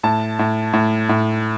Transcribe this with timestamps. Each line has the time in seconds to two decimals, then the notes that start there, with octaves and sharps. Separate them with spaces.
0.03 A2 A5
0.39 A2
0.73 A2
1.09 A2